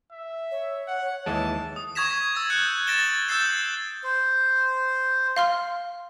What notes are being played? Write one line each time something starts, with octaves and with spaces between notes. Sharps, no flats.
E5
C#5
F#5
D#2 E3 G#3 A5
D#6
C#6 D#6 G#6 A#6 B6 E7
E6 A6
F#6 G6 C#7
A6 A#6 D7 E7 G7
E6 G6 A6 C7 E7
C5
F5 C6 F6